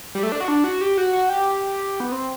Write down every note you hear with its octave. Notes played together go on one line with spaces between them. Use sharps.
G3
A3
D4
F#4
D4
F#4
G4
F#4
F#4
G4
B3
C4